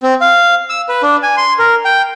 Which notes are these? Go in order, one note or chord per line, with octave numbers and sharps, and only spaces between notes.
C4
F5
E6
B4
D4
G#5
C6
A#4
G5